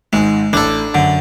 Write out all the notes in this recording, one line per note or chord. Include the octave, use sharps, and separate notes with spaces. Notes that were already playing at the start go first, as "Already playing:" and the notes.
G#1 G#2 G#3
A1 A2 D4 A4
F#2 D3